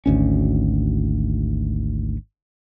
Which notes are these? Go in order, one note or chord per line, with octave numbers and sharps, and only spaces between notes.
G#1 D2 C#4